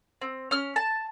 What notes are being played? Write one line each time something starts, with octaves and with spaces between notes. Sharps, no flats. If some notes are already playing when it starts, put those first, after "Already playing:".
C4
C#4 F6
A5